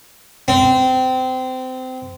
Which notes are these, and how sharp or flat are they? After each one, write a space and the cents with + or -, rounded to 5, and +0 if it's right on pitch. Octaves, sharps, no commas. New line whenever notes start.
C4 -25